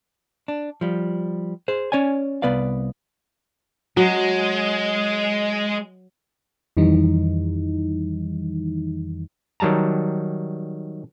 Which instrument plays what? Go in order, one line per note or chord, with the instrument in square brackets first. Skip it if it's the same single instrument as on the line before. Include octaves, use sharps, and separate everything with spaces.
[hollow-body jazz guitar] D4
F3 G3
G#4 C5
C#4 C#5 D5 G#5
C2 B3 B4 D5 F5
[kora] F#3 [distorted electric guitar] G#3
[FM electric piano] F2 D#3 E3 G3 D#4
[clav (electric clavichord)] D#3 F#3 G3 A5 A#5